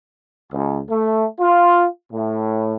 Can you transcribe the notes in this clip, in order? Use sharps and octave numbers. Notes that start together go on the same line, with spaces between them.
C#2
A3
F4
A2